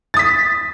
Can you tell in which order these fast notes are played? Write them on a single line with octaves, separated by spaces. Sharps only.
A6 D#6 B6